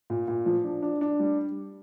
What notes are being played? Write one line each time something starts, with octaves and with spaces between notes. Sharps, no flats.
A#2
A#2
F3
D4
D4
D4
G3